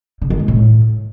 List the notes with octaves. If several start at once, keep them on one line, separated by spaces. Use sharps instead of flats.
D3
D#3
G#3
A2